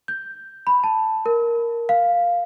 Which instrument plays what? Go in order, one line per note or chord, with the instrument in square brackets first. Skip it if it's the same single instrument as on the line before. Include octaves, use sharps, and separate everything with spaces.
[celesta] G6
B5
A5
A#4
F5